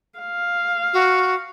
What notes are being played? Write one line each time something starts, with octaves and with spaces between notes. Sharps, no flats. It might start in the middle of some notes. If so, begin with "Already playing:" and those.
F5
F#4